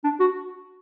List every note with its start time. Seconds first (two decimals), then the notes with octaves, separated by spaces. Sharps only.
0.04 D4
0.20 F#4